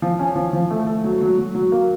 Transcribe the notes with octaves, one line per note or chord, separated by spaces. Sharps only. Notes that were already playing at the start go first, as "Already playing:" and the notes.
F3
C#4
F3
F3
A3
A3
F#3
F#3
F#3
F#3
A#3